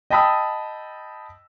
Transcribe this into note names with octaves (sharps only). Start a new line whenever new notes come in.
D#5 G5 A5 B5 D#6 E6